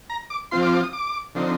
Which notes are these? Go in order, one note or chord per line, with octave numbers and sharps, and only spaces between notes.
A#5
D6
F3 C4 F4 C6
D6
D6
D#6
D6
D3 F3 C4 D#4